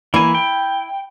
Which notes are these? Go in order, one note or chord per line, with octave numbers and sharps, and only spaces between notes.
E3 A#3 E4 G#5
G5